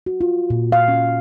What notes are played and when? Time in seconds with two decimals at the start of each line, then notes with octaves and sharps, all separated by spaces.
0.06 F#4
0.21 F4
0.50 A#2
0.72 F5
0.88 C#4